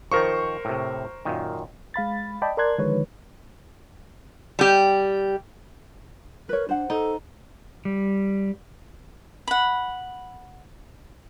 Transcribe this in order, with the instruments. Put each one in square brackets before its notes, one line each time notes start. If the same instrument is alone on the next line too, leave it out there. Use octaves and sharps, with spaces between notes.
[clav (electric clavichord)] D#3 F3 [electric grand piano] A#4 C5 C#6
[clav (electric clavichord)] A2 C3
F#2 A#2 D#3
[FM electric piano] G#3 F5 B5 A6
D5 D#5 G5 A5 B5 D6
A#4 D5 A5 C6 F#6 G#6
D3 D#3 F3 G#3 B4 C#5
[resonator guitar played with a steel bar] G3 G4
[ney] A#4 [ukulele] B4 C#5
[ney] D4 [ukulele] C5 F#5
[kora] D#4 [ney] A4
[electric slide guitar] G3
[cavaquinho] F#5 B5